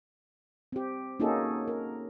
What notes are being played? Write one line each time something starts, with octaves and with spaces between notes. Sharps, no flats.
C4 G4
A#3 C#4 D#4 F#4 G#4 A4
A#4